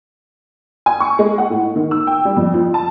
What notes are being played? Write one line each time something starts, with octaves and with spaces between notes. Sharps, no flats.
G#5
C#6
G#3
F#5
A2
D#3
E6
G5
G3
F2
F3
A5